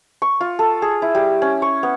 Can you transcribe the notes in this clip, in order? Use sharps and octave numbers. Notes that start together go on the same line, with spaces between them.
C#6
F4
A4
G#4
E4
G3
C#4
C#6
B3